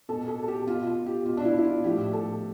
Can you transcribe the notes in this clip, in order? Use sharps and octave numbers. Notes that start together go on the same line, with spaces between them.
B2 A4
A4
A4
G4
B2 F4
F4
G4
B2 F4
D4
E4
E4
F4
A2 F3 G4
A4